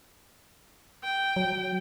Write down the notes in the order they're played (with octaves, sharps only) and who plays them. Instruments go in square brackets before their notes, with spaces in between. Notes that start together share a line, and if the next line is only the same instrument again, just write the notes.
[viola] G5
[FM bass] F#3